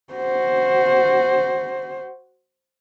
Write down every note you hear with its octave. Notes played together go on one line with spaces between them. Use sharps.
F#4 C5